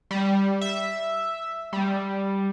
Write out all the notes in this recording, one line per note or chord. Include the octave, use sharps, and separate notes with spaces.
G3
E5
G3